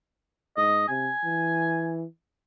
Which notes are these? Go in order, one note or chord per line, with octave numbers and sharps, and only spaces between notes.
G#2 D#5
C3 G#5
E3